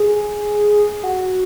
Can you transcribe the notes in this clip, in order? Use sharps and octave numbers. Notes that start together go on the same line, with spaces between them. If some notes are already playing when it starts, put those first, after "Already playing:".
Already playing: G#4
F#4